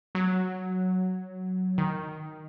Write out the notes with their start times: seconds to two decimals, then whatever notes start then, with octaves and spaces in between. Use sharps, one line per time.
0.15 F#3
1.78 D#3